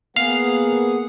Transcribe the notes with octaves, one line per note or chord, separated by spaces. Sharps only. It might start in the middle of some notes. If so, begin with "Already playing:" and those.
A#3 B3 G#4 F5 F#5